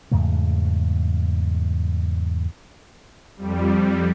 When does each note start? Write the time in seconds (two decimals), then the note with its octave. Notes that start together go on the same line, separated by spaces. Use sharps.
0.11 E2 G#2 C#3 A3
3.37 F2 G3